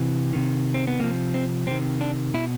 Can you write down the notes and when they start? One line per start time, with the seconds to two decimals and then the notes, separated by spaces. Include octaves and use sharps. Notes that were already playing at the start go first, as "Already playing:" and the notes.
Already playing: C3 E3
0.33 C3 D#3
0.74 C4
0.87 B3
1.00 C3 F3 A#3
1.34 C4
1.67 C3 D#3 C4
2.01 D4
2.34 B2 E4